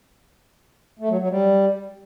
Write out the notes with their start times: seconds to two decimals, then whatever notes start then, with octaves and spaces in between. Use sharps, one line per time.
0.99 A3
1.09 F#3
1.20 F#3
1.30 G3